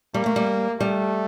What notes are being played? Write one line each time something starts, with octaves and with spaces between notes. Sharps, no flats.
G3 A#3
A3
G3
G3 A3